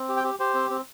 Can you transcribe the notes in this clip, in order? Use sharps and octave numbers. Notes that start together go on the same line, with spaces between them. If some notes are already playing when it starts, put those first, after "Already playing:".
Already playing: C4
G4
G5
G4
G4 C5
C4
C4